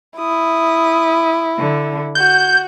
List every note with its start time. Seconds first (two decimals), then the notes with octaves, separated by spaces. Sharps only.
0.18 E4 D#6
1.60 D3
2.15 F#4 G6